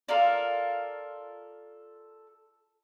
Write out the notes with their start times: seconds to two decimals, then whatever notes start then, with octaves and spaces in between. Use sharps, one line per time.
0.08 F4 A4 A#4 D5